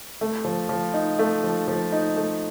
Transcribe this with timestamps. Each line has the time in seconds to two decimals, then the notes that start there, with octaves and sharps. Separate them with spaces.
0.21 A3
0.45 F3
0.69 F3
0.94 D#4
1.19 A3
1.44 F3
1.68 F3
1.92 D#4
2.16 A3